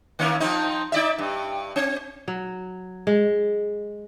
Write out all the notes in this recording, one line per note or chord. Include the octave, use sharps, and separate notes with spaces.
D#3 A#3 C#4
F3 C4 D#4
D#4 D5 E5
G2
C4
F#3
G#3